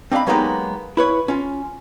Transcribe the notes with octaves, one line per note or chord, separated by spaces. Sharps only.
C4 D4 D#5 F5 B5
F#3 G#3 A#3 B3 D#4 G4
E4 B4 C#5
C#4 F4